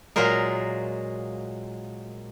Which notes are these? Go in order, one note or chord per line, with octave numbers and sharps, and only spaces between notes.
A#2 F#3 G#3 F4 A#4